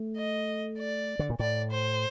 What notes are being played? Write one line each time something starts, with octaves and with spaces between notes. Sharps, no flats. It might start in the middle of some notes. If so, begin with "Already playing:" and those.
Already playing: A3
D#5
D5
D3
A#2
A2 D5
C5